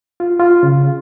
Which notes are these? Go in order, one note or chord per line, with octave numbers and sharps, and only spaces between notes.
F4
F4
C#3